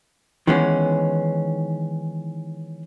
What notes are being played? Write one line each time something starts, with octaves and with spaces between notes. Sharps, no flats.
D#3 E3 G#3 B3 C#4